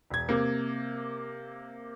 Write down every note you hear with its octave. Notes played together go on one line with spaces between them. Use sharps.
E1 G#6
C3 A#3